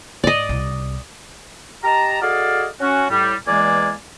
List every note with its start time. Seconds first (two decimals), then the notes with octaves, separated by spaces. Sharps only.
0.24 G#2 D5 D#5
0.49 C2 C3
1.84 G4 D#5 A5 A#5
2.22 F#4 G#4 A4 D5 D#5 F5
2.81 C#4 F#4
3.10 A2 G3
3.47 E2 E3 G#3 A#3 D5 G#5